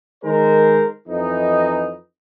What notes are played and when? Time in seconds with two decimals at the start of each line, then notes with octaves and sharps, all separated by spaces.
0.24 D#3 G#3 A#4 C5
1.08 F2 E3 D#4